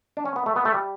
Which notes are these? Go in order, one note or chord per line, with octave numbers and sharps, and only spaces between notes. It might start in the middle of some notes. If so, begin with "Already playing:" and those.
D4
C#4
B3
A3
B3
A3
G3